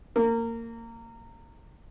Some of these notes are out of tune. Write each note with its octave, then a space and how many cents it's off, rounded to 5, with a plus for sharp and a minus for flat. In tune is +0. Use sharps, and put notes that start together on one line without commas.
A#3 -20